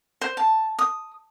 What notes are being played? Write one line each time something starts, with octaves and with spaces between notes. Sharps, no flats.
C5
A5
D#6